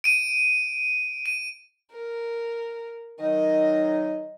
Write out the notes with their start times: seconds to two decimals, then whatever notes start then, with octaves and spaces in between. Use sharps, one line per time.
0.04 D7 D#7
1.26 D#7
1.92 A#4
3.19 D#3 F#3 D#4 D#5